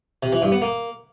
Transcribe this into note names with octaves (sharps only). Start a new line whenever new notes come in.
C3
E3
G2
B3
A#3